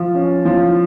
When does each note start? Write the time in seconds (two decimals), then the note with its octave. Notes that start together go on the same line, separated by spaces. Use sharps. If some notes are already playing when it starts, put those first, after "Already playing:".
Already playing: F3
0.15 C#4
0.45 F3